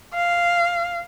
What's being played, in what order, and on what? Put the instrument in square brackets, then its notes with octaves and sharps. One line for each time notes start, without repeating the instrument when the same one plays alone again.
[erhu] F5